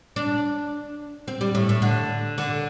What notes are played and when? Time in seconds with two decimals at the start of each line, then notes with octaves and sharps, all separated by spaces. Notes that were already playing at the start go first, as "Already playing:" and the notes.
0.16 D4
1.28 C4
1.41 G3
1.55 A2
1.69 A2
1.82 D3
2.38 D3